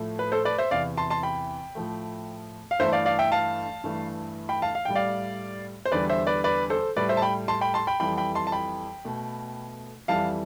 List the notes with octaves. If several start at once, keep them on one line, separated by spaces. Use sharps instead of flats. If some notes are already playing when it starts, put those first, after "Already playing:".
Already playing: A2 F3 A3
B4
A4 C5
B4 D5
C5 E5
E2 C3 E3 D5 F5
A5 C6
A5 C6
G5 B5
A2 F3 A3
F5
G2 E3 A3 C5 E5
D5 F5
D5 F5
E5 G5
F5 A5
G2 E3 A3
G5 B5
F5 A5
F5
A2 G3 G5
D5 F5
C5
E2 D3 G3 B4 D5
C5 E5
B4 D5
B4 D5
A4 C5
A2 G3 B4 D5
C5 E5
A5
G5 B5
A5 C6
G5 B5
A5 C6
G5 B5
F2 E3 G3 G5 B5
G5 B5
A5 C6
A5
G5 B5
B2 A3
F2 E3 G3 F5 A5